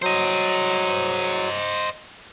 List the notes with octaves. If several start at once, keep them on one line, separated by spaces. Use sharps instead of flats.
F#3 C5 D#5